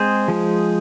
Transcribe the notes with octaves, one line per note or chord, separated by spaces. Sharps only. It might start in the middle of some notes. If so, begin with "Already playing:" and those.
Already playing: G#3 C4 G#4 C5
F3 G#3